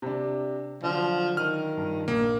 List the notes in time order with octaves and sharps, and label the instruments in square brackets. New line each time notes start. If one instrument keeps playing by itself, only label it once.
[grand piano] C3 D4
[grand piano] D3 F#3 D5 [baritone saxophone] F3
[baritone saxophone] D#3 [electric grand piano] F6
[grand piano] G2 F3
[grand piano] A#1 [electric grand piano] A#3